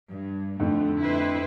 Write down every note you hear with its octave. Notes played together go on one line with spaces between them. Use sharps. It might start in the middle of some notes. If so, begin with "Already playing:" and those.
G2
F2 D3 A3
E4 B4 C5